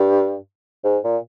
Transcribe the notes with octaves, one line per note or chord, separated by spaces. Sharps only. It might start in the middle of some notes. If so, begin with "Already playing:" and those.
Already playing: G2
G#2
A#2